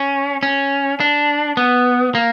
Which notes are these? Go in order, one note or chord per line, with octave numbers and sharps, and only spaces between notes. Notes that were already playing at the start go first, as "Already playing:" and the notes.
Already playing: C#4
C#4
D4
B3
A#3